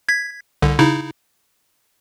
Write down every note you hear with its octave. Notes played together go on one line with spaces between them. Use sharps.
G#6 B6
C2 D3
C#3 D#4 E4